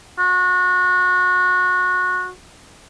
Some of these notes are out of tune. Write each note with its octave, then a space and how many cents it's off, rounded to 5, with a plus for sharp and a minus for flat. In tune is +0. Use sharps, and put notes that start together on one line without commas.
F#4 -25